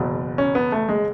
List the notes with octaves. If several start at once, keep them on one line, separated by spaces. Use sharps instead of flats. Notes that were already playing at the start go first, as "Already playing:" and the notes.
Already playing: F#1 E2 B2
C#4
B3
A3
G#3